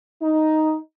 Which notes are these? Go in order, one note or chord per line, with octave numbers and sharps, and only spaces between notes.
D#4